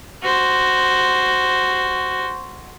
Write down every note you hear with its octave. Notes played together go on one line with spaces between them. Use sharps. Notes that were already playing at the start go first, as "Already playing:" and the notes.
F#4 C5